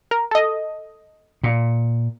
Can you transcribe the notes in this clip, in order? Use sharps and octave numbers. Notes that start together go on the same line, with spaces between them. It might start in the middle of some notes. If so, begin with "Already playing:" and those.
A#4
A4 D#5
A#2